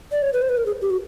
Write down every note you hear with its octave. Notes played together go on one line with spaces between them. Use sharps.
D5
C#5
B4
C5
B4
A#4
G#4
G4
F#4